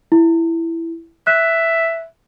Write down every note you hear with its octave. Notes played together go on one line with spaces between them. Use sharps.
E4
E5 F#6